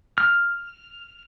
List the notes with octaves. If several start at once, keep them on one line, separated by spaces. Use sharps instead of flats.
F6